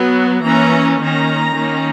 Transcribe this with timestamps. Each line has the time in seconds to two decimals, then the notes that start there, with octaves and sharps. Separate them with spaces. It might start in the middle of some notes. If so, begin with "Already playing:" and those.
Already playing: F#3 B3
0.43 E3 A#3 C#4 A#5
1.00 D#3 A#3 C#4 A#5
1.56 D#3 A#3 C#4